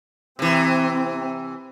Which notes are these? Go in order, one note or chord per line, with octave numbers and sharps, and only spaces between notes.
C3 E3 C4